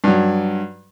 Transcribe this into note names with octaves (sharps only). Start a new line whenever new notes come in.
G2 F#3